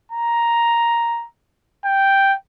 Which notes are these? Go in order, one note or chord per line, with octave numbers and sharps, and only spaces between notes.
A#5
G5